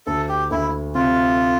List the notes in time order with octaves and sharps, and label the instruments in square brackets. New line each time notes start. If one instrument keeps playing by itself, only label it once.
[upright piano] D2 [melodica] A4
[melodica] G4
[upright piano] D2 [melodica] E4
[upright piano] C3 [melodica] F4